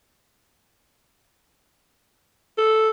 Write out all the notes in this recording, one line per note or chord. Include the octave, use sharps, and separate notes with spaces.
A4